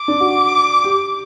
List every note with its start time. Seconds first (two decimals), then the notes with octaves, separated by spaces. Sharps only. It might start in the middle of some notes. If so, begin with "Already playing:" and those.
Already playing: D6
0.08 D4
0.20 F#4
0.84 G4